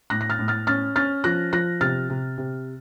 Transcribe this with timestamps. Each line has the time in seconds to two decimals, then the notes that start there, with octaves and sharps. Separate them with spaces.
0.10 A2 F#6 A#6
0.21 A#6
0.30 F6 A6
0.39 A2
0.48 F6 A6
0.67 C#4 F6 A6
0.96 C#4 F6 A6
1.24 F3 F#6 A#6
1.53 F3 F#6 A#6
1.81 C3 F6 A6
2.10 C3
2.38 C3